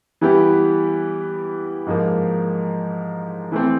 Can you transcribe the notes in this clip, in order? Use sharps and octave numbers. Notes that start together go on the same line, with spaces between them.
E3 G3 B3 E4 G4
G#2 F3 A#3
E3 A3 C4